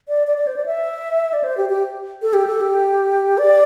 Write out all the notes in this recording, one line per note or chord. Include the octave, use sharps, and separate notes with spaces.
D5
D5
D5
C5
D5
E5
D5
C5
G4
G4
A4
G4
A4
G4
D5